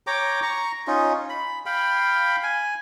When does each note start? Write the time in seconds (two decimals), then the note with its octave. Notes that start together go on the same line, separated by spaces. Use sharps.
0.07 C#5 G5 A#5 D6
0.42 A#5 C#6
0.87 C#4 D#4 F4
1.30 B5
1.66 F5 G5 B5
2.43 G#5